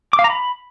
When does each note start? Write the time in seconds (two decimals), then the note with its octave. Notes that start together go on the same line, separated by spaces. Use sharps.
0.13 D6
0.19 F5
0.24 A#5
0.30 B5